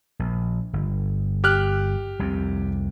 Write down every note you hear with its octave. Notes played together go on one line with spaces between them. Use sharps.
A#1
G1
G4 F6 F#6
C2 F2 C3